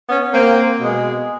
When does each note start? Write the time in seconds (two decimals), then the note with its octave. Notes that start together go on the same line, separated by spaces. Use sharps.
0.09 B3 C#4
0.33 A#3 C4
0.80 B2 G#3